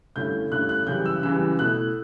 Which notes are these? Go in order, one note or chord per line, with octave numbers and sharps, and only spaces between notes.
G2 D3 A3 C#4 E4 G6
G2 D3 A3 C#4 E4 F#6
F#6
F#2 C#3 E3 G3 G6
E6
F#2 C#3 E3 G3 E6
B2 A3 E4 F#6